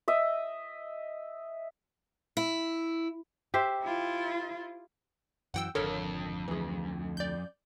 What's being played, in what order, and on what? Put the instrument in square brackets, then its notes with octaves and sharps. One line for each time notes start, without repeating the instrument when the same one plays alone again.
[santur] D#5 E5
[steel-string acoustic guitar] E4
[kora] G4 C5 E5
[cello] E4 F4
[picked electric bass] F#2 E3 F#3 [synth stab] F#5 G5 E6
[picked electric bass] G#1 D3 [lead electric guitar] F2 [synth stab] A4 A#4 C#5
[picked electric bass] D2 [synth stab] E3 G#4
[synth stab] D5 G6